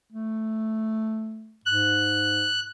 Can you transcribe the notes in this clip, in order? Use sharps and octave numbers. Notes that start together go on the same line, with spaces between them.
A3
G#2 F#6